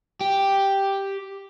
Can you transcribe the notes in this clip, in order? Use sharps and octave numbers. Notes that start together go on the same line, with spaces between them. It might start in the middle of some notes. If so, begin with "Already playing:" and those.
G4